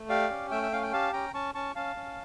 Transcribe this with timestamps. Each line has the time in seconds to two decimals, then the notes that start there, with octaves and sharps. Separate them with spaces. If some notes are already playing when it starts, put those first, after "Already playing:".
Already playing: A3
0.09 G4 D5 F5
0.30 C#4
0.51 A3 E5 G5
0.63 E5
0.72 C#4 F5
0.83 G5
0.92 G4 F5 A5
1.13 C#4 G5 A#5
1.34 C#4 A5 C#6
1.55 C#4 A5 C#6
1.76 C#4 F5 A5
1.96 C#4